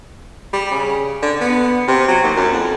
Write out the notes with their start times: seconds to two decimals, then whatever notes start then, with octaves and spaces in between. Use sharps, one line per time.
0.53 G3
0.71 C#3
1.22 D3
1.41 B3
1.88 C3
2.09 F#3
2.24 D#2
2.37 F#2
2.53 F2